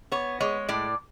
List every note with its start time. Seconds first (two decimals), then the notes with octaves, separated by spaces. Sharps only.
0.12 B3 C#5
0.40 G#3 C#5
0.69 A2 D5